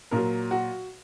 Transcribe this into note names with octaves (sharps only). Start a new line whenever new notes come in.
A#2 F#3 A#4
F#4